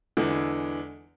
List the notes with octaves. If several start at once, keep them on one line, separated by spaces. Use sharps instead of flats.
E2 D3 E3 G#3